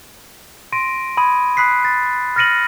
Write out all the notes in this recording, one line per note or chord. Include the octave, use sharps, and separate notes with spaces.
C6 A#6 D7 D#7
B5 D#6 G#6 D#7
B5 D#6 F#6 B6 C7
A6
F6 A6 A#6 C#7 D#7 F#7